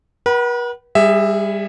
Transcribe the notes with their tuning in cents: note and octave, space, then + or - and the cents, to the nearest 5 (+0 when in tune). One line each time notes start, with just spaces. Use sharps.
B4 -45 F#5 +35 B5 +0
G3 +25 G#4 -10 E5 +0